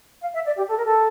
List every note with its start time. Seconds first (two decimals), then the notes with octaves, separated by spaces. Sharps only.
0.22 F5
0.34 E5
0.45 D5
0.56 G4
0.68 A4
0.76 A#4
0.85 A4